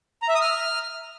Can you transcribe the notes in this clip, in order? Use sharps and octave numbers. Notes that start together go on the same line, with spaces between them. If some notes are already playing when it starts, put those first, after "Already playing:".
A#5
E5
D#6
F6